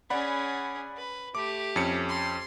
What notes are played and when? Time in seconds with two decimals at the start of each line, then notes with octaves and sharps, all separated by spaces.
0.10 C#4 G#4 D5 F#5 B5
0.97 B4
1.35 A3 G4 D6
1.76 F2 C#4 C#7
2.09 C6